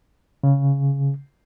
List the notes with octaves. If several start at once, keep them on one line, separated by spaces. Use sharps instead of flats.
C#3